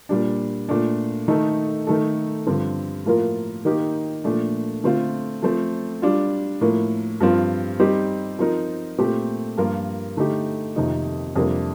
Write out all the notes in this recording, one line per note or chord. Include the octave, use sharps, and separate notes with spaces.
A#2 G3 D4
A#2 A3 D4
D#3 A3 D#4 A4
D#3 A3 D#4 A4
G2 D3 F3 C4
A2 F3 A#3 F4 A#4
D#3 A#3 D#4 G4 A#4
A#2 F3 A3 D4
D3 A3 C4 F4
F3 A3 C4
G3 D4 F4
A2 F3 A#3
G2 F3 C4 F4
G3 C4 D#4 G4
F3 C4 D#4 A#4
A#2 A3 C4 G4
G2 F3 A#3 F4 A#4
D3 A3 D#4 G4
F2 C3 D#3 A#3 D#4
F2 C3 G3 A#3 D4